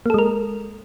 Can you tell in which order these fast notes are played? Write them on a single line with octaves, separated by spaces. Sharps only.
A#3 A4 G#3 A#4